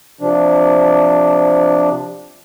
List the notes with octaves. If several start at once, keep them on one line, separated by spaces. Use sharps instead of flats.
C3 F3 D4